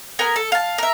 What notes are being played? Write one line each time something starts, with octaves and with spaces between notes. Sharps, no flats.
B3 A#4 G#5
A4
F5 A5
A#4 E5